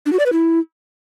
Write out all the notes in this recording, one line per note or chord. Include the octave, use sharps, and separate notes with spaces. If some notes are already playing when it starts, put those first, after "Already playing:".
D4
F#4
D5
B4
E4